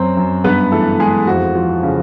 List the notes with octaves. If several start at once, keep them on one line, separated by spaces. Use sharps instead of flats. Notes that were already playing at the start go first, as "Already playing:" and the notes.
Already playing: F#2 F#3 C4 C5
F#2
G2 B3 B4
E3 A3 A4
E3 G#3 G#4
F2 F#4
F3
C#3